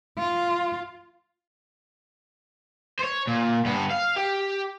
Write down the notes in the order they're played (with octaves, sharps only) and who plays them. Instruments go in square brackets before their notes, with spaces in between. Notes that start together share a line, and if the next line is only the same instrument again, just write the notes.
[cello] F4
[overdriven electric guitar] C5 C#5
A#2
G2 B3
F5
G4